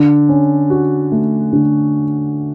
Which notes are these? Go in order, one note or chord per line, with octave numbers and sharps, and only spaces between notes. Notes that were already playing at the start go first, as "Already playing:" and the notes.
Already playing: D3
C#4
F#4
A3
D3